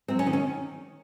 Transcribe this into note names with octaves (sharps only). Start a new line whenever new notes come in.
F#3 C4
C#4
D#3
C#4